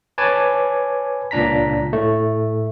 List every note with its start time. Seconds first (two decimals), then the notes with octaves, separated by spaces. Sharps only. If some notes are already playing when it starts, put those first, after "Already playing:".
0.18 B4 C#5 G#5 A5 D6
1.31 C#2 A#2 D4 A#5 B6
1.93 A2 A3